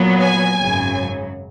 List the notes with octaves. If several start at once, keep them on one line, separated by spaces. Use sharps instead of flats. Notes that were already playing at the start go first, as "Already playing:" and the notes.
Already playing: A#2 F#3 B3
G#5
G#1 F#2 C#3 F#3